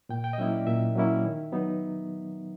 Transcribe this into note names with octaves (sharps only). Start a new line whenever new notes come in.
A#2 G5
G5
D#5
F#3 A#3 C#4 E4 E5
D5
A#2 E5
F#3 A#3 C#4 E4
D#3
F#3 B3 D#4